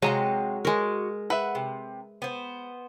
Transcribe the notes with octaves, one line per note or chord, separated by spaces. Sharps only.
C3 F#3 G#3 F#4 D#5 F5 A#5
G#3 F#4 A#4
B4 E5 F#5
C3
B3 C5